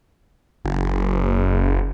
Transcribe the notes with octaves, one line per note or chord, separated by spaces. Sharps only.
F#1